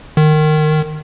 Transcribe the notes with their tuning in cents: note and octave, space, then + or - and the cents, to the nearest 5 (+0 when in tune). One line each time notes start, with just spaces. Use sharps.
D#3 -20